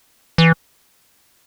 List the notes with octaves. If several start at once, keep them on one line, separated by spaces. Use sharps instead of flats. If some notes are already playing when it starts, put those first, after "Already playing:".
E3